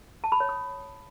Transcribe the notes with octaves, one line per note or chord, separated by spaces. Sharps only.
A5
B5
C#5
D#6